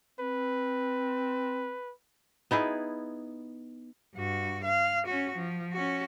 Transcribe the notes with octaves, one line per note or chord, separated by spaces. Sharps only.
C4 B4
B3 D#4 E4 G#4
G2 F#4
F5
C#4 F#4
F3
C#4 F#4